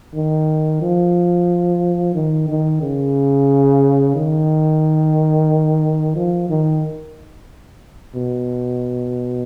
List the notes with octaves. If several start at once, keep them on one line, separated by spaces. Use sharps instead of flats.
D#3
F3
D#3
D#3
C#3
D#3
F3
D#3
B2